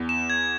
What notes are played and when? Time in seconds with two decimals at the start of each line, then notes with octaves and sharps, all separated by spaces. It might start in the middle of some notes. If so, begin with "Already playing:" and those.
Already playing: E2
0.09 E7
0.30 G#6